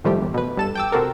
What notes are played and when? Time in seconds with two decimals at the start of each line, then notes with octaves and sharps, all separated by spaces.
0.04 A2 D#3 F3 G3 A3 G4
0.17 G1 E2
0.34 B2 B4
0.57 G2 A4 E7
0.75 G5 D6 E6
0.92 C3 C4 F#4 A4 A#4